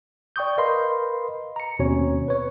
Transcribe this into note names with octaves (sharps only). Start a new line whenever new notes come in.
D5 G5 C#6 D#6 G6
A#4 B4 D#5 F5 B5 C6
A#5 C#7
D#2 B2 C4 C#4 C#5
B4 C#5